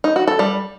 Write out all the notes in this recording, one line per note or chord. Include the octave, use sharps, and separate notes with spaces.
D#4
F#4
A4
G3